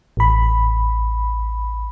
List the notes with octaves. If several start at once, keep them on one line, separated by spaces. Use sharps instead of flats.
A1 B5